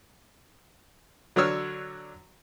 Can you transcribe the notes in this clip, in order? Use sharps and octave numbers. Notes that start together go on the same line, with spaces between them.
D3 F#3 D4 C#5 E6 F6